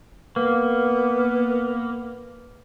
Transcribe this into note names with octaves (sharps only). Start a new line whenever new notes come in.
A#3 B3